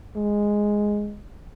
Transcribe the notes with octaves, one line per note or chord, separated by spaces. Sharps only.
G#3